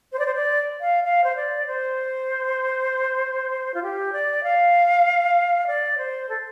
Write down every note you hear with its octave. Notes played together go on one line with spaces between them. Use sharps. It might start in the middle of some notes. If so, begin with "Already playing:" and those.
C5
D5
C5
D5
F5
F5
C5
D5
C5
F4
G4
D5
F5
D5
C5
A4